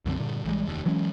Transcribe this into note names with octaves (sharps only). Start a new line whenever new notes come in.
C2 F#2 D3 C4
G2 A#2 D3
A#1 E3 G3 G#3
F1 D#2
E3 F#3 G#3 C#4